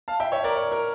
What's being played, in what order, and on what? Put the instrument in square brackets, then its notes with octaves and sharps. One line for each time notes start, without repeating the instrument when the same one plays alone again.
[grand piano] F5 A5
E5 G5
C#5 E5
A#4 D5
C#5
A#4